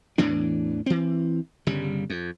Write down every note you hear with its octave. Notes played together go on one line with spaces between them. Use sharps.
E2 A2 E3 D4
E3 C4
G1 C#3 G3
F2